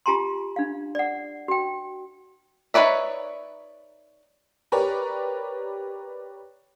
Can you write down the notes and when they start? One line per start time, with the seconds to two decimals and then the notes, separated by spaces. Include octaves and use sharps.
0.06 F4 G4 G#5 A#5 C6
0.56 D4 F5
0.95 D5 F#5
1.48 F#4 G5
2.74 D#4 B4 C#5 D5 E5
4.72 G4 A#4 B4 C#5 D5